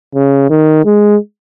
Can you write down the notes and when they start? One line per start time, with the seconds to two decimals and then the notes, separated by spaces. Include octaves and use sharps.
0.15 C#3
0.50 D#3
0.85 G#3